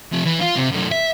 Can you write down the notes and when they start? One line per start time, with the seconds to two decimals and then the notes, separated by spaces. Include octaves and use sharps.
0.12 C3 F3
0.25 E3
0.40 F4
0.57 C3
0.71 F#2 A3
0.91 E5